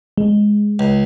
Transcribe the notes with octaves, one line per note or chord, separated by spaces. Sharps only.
G#3
C#2